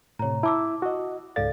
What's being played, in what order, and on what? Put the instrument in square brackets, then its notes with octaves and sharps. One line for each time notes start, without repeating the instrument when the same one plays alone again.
[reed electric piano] A2 C3 [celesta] C#5 A#5
[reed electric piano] E4 [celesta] A5 D6 E6
[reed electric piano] F#4 D#5
[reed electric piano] C#2 G#2 A6 [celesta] A4 D5 F5